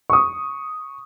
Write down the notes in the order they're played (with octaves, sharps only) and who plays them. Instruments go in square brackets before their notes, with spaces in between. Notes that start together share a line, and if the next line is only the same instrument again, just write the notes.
[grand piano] C#6 D#6